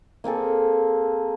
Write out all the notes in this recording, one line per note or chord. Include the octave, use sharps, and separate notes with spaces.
A#3 C4 G#4 A4